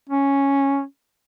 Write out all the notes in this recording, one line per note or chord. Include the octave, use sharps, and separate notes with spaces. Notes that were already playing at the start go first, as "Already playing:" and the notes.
C#4